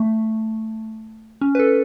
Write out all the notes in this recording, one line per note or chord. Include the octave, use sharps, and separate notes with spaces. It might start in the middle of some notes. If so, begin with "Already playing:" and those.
Already playing: A3
C#4
B4
A4